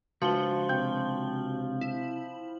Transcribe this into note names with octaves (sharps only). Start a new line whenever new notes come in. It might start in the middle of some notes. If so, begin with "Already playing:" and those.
C#3 F3 G#3 D4 F#4 F#7 G7
C3 G5
E4